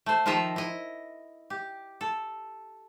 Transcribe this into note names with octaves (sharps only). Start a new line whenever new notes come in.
A3 C5
D#3 F3 F4 D#5 E5 A#5
E4 D#5
G4
A4